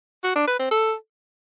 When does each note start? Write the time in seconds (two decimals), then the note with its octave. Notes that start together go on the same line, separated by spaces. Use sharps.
0.24 F#4
0.36 D4
0.47 B4
0.59 C4
0.71 A4